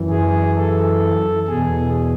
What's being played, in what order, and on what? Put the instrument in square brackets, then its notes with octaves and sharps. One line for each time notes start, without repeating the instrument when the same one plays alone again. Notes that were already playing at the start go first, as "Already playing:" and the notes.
Already playing: [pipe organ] F#2 E3
G#4
A4
E2 B2 G#4